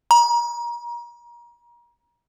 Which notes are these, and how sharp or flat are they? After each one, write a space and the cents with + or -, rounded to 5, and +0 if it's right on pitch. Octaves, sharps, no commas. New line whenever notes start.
A#5 +30